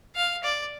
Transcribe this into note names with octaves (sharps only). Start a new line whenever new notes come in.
F5
D5